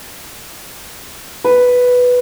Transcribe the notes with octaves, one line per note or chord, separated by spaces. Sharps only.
B4